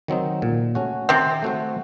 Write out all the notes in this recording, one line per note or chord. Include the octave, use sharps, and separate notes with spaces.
D#3 F#3 C4 D#4
A#2
A3 C#4 F#4
C3 D#3 C4
A3 C4 F#4 C5